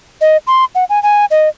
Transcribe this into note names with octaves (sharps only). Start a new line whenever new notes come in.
D#5
C6
F#5
G#5
G#5
D#5